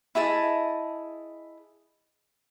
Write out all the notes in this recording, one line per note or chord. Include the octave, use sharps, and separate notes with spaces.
E4 G#4 D#5 A5